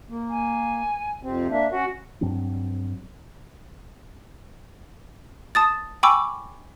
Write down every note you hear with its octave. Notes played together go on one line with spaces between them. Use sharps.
A#3
G#5
F2 C3 C4
A#3 D4 E5
C#4 F#4
G2 F#3 C4 D4
A5 D#6 A6
G5 G#5 B5 C#6 D6 E6